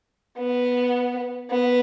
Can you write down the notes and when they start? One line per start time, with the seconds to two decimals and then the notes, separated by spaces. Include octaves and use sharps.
0.38 B3
1.51 B3